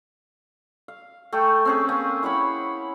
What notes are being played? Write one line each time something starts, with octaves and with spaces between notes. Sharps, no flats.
F5
A3 G5 G#5
C4 C#4 G#4
A#3 G#5
E4 C#5 F#5 B5